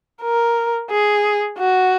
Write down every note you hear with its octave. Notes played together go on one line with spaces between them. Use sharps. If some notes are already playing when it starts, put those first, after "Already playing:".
A#4
G#4
F#4